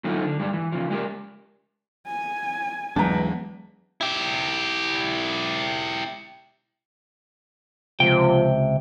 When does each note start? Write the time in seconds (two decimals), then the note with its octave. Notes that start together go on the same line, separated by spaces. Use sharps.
0.04 D3 F#3 A3 D#4 F4
0.24 D3
0.39 G2 G3 G#3
0.53 E3
0.72 C#3 F3
0.90 G#3 G4 G#4 A#4
2.07 G#5
2.96 E2 F#3 G#3 D4 B4 A5 A#5
4.01 E4 G4
8.00 C#2 C3 F3 G5